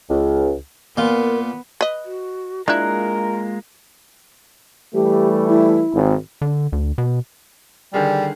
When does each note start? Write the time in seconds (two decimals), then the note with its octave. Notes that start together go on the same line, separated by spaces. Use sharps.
0.10 C#2
0.97 A#2 B3 F4 A#4
1.81 B4 D#5
2.05 F#4
2.68 G#3 A#3 D4 E4 F4 A#4 F#6
4.94 E3 G3 A3 G4
5.48 E4
5.94 G#1
6.42 D3
6.72 D2
6.98 B2
7.94 D3 D#3 G3 G#4